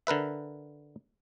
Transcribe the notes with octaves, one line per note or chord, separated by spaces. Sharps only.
D3 A#4 B4 E5